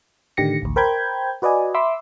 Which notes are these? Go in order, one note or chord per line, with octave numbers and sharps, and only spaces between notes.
A2 D3 D#3 G4 A#6 C#7
A1 D2
A#4 C5 G5 B5 G6 G#6
F#4 B4 D5 D#5 G#5
E5 B5 C6 D6 E6